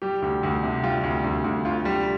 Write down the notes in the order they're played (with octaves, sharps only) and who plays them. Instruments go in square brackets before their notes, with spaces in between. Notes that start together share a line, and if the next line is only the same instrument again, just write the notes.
[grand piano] G3 G4
D2
D2
C3
G3 F4
D2
D2
D2
D2 F4
G3